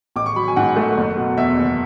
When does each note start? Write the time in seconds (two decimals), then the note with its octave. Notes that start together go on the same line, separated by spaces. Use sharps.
0.16 A1 D6
0.26 C#6
0.36 F#3 B5
0.48 G#5
0.56 G#2 F#5
0.76 A3
0.97 F#1
1.17 B2
1.37 E2 E5
1.57 F#1